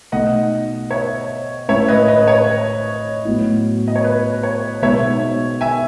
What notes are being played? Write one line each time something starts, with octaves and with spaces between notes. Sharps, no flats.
B2 A3 D#4 D#5 F#5
C#5 E5
A2 G#3 C#4 E4 C#5 E5
B4 D#5
B4 D#5
C#5
A2 F#3 B3 E4
D#5
C#5
B4
C#5
B2 G#3 B3 D#4 C#5 E5
E5 G#5